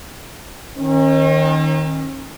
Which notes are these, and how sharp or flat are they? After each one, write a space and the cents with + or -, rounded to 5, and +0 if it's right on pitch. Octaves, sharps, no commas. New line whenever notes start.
D#3 +0 C#4 -45